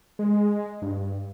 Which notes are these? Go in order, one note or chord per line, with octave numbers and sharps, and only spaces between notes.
G#3
G2